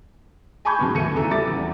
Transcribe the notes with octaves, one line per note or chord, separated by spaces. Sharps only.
G#5 A5 B5 C#6 G6 G#6
F#2 D#3 G#3 B3
D#2 A3 C#7 D#7
E2 C#3 E3 A4 A#5
G3 E5 D6 A6
E2